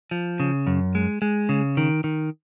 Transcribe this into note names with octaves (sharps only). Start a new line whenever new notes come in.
F3
C#3
F#2
G#3
G#3
C#3
D#3
D#3